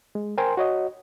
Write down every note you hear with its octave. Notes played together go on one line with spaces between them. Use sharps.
G#3
A#4 C5 G5 G#5 C6
F#4 C#5 D#5